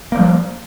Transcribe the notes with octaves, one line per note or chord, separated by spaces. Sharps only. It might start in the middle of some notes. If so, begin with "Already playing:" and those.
F3 G3 A#3